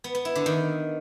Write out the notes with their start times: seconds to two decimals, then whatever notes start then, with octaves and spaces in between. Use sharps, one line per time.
0.04 B3
0.15 B3
0.25 E4
0.36 D3
0.46 D#3